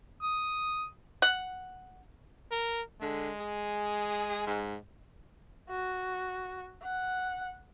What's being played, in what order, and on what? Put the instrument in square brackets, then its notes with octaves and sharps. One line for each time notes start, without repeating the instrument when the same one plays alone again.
[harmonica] D#6
[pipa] F#5
[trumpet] A#4
[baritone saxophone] D3 [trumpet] G#3
[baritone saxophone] G#4
G#2
[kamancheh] F#4
F#5